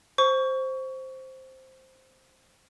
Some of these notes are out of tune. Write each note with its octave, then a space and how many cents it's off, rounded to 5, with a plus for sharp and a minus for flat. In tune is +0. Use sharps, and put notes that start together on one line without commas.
C5 +0 C#6 +20